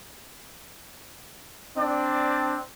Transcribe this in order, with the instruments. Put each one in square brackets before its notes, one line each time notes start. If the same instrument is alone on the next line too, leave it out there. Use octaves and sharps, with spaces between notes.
[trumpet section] C4 D4 D5